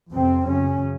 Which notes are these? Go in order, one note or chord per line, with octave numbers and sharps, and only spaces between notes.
F2 C3 C4
F#2 C#3 C#4